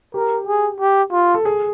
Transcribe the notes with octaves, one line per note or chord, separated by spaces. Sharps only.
G4 A#4
G#4
G4
F4
A4
G#4